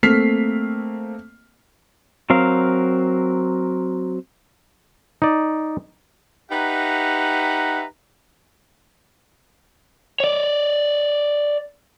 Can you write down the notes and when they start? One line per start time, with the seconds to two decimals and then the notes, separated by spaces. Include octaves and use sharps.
0.03 A3 A#3 C4 F6 B6 C7
2.30 F#3 C4 A#4 F5
5.22 D#4 D5
6.51 D#4 G4 B4 E5 F#5 A#5
10.20 C#5 D5